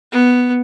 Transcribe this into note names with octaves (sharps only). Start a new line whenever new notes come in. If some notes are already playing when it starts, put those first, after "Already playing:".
B3